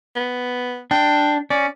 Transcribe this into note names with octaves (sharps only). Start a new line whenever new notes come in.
B3
D4 G5
C#4 D5